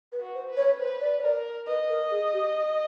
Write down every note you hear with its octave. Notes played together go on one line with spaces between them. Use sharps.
B4
F#4
C5
B4
C#5
B4 C5
D5
C#5
A#4 D5
B4 D#5
A#4
G#4
G4